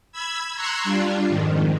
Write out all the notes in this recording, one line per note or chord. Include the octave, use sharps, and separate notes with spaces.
B5 E6 G#6
A#5 C6 C#6 E6 F#6 G#6
G3 D4 F4
F2 G#2 D#3